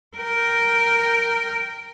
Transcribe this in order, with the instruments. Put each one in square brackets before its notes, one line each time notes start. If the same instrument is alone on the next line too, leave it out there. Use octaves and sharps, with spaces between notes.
[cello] A#4 G5